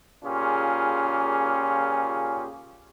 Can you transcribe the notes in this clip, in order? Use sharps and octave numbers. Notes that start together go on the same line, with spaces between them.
A#2 C#3 C#4 F4 G4 G#4